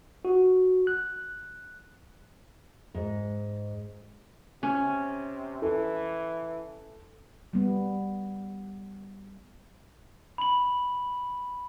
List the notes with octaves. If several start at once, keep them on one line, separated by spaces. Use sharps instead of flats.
F#4
F#6
G#2
C3 C#4
E3 A4
G3 B3
B5 F#7